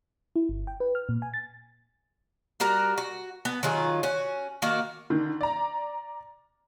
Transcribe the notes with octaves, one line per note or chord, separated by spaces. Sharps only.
E4
G1
G5
B4
F6
A#2
G#5
A6
G3 F#4 A#4 A#5
F#4
B3
D#3 F#3 F4 G#4
C#4 F#4
D#3 A#3 F#4
D3 D#3
D5 A#5